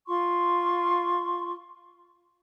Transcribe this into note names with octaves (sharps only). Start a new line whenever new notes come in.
F4 C6 C#6